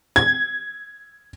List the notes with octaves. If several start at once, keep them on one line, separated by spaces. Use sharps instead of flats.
G#6